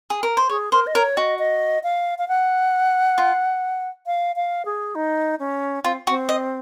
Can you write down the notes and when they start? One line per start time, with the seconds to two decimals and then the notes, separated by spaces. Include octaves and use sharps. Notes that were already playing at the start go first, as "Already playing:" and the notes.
0.10 G#4
0.23 A#4
0.37 C5
0.49 G#4 C#5
0.72 A#4 C5
0.87 D#5
0.95 A#4 C#5
1.17 F#4 D#5
1.39 D#5
1.83 F5
2.18 F5
2.28 F#5
3.18 F4
4.06 F5
4.36 F5
4.65 G#4
4.95 D#4
5.39 C#4
5.84 C4 F4
6.07 C4 F#4
6.29 D#5